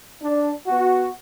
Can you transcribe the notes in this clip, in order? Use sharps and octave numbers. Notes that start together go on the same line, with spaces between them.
D4
B3 F#4